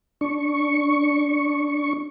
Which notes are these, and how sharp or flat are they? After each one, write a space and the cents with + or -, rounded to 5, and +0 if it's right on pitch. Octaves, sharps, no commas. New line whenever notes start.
D4 -10 C#6 +0